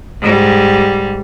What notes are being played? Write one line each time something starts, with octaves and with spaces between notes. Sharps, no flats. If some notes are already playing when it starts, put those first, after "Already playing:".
G#2 G3